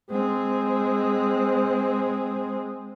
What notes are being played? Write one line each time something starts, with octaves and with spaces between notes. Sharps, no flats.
G#3 C4